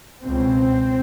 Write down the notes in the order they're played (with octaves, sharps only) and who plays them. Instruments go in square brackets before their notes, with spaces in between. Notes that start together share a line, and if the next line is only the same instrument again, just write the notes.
[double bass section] C#2 B2 C4